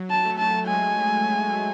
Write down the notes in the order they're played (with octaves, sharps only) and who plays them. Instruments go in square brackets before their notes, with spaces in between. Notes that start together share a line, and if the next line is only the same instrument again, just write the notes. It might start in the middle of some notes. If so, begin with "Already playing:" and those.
Already playing: [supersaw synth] F#3
[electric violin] A5
[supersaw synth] A3
[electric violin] A5
[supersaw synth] G#3 [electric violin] G#5